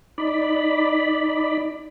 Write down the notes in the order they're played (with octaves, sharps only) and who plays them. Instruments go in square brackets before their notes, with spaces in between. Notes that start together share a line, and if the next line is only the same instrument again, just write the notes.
[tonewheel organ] D#4 D5 B5